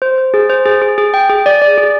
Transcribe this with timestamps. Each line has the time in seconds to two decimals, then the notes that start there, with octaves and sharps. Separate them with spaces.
0.02 C5
0.18 C5
0.34 G#4
0.50 C5
0.65 G#4
0.82 G#4
0.98 G#4
1.14 G5
1.30 G#4
1.46 D5
1.62 D5
1.78 G#4